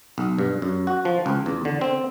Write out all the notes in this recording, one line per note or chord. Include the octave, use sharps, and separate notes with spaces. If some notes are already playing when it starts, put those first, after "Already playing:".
B1
G2
F#2
F#4
F3
C#2
E2
D3
C4